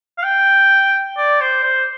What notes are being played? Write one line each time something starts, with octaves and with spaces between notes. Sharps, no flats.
F5
G5
D5
C5
C5